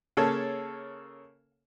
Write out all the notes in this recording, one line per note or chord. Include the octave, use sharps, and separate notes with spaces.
C#3 A#3 A4 C#5 A5